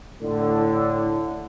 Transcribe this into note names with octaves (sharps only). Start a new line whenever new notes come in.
A2 D3